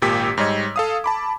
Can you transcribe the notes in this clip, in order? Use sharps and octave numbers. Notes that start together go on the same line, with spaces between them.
G#1 A#2 G4 E6 B6
G#2 G3 C#5 D#5 G#6
A4 F5 D#6
A5 B5 D6